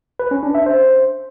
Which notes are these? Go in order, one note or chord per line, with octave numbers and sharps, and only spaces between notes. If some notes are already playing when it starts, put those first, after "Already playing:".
B4
C#4
D4
E5
C5